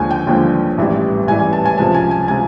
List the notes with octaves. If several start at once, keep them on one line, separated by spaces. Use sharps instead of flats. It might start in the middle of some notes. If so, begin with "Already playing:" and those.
Already playing: D#2 D3 F3 G#3 G#5
G5
D#2 D3 F3 G#3
A1 G#2 E3 G3
A1 G#2 E3 G3 G#5
G#5
A5
G#5
C#2 C3 F3 G#3 A5
G#5
G#5
C3 F3 G#3 G#5